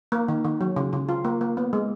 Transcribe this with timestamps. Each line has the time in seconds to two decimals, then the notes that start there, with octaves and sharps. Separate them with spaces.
0.12 A#3
0.28 D#3
0.44 D#3
0.61 F#3
0.76 C#3
0.93 C#3
1.09 F4
1.25 A#3
1.41 A#3
1.57 B3
1.73 G#3